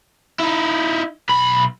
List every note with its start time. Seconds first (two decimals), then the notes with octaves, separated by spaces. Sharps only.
0.40 D#4 E4
1.29 B1 B5